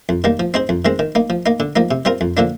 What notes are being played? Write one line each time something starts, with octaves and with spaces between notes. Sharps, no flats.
F2
D#3 G3 A#3
F3
C4 D#4 G#4 C5
F2
D#3 G#3 C4
D#3
A#3 D#4
F3
A#3 D#4
D3
F3 A#3 D#4
C3
G3 C4 F4 A#4
F2
D3 F3 A#3 D4